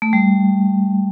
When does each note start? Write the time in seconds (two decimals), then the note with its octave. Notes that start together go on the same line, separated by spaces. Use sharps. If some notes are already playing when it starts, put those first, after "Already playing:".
0.02 A3
0.13 G3